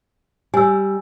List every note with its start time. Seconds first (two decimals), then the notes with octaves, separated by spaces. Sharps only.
0.54 G3 G#5 E6